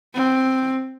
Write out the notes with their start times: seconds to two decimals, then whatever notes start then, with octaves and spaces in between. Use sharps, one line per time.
0.14 C4